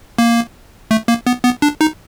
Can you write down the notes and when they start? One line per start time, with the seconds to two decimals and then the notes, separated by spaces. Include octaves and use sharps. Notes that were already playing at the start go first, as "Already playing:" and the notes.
0.18 A#3
0.91 A3
1.08 A#3
1.27 B3
1.44 B3
1.62 D4
1.81 D#4